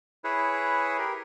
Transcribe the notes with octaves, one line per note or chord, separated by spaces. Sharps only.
E4 G#4 B4 C#5
G4 A#4